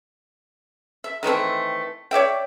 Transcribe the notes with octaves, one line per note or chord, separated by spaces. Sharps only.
E5
D#3 E3 A3 C4
C#5 D5 E5 G5